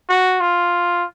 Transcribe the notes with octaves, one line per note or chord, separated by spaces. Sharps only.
F#4
F4